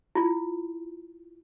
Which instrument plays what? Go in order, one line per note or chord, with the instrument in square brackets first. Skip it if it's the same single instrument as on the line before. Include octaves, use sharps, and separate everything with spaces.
[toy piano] E4 F4